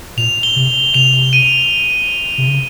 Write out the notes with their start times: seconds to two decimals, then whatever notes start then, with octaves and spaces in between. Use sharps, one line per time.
0.17 A#2 F7
0.43 G7
0.56 C3
0.94 C3 F7
1.33 D#7
2.38 C3
2.48 C#3